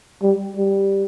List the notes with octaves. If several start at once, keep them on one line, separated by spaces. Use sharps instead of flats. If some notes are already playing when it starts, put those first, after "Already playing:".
G3
G3